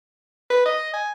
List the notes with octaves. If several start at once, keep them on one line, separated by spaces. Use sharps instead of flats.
B4
D#5
G#5